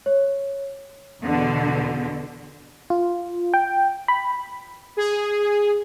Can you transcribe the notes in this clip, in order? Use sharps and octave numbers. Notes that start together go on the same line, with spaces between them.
C#5
E2 B2 D3
F4
G5
B5
G#4